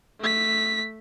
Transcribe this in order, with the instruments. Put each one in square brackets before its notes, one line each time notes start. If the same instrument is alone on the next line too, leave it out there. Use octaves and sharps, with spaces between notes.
[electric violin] A3 B6